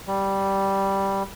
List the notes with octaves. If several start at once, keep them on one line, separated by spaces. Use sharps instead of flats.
G3